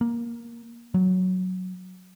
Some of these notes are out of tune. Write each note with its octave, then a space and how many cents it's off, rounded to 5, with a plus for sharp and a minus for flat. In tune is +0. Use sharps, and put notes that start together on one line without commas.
A#3 +10
F#3 +0